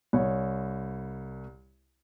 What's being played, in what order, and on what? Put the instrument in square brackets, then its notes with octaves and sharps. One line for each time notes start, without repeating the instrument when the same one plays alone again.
[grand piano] C2 C#5